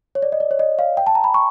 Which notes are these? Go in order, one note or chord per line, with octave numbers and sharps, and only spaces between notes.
C#5
D5
D#5
D5
C#5
D#5
F5
G5
A5
A#5
B5
C#6